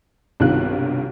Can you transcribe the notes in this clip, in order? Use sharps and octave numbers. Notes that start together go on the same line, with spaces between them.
B1 G2 C3 D#3 F4 F#6